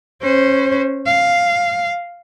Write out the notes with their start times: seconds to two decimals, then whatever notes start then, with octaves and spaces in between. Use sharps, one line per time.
0.22 C#4 C5
1.06 F5